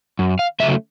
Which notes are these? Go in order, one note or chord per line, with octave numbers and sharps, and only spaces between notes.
F#2
F5
C#3 F#3 A3 E5